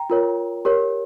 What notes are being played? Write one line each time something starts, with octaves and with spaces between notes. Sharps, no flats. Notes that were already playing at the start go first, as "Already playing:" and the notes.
Already playing: G5 A#5
F4 A#4 C#5
G4 A#4 C#5